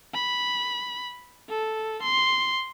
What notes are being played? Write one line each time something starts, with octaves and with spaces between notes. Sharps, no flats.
B5
A4
C6